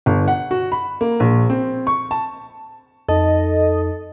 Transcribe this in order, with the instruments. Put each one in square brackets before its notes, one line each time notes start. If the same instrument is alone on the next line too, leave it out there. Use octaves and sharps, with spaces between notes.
[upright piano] G1
F#5
F#4
B5
A#3
A#1
C4
C#6
A5
[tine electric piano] F2 D#4 [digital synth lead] A4 [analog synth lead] D#5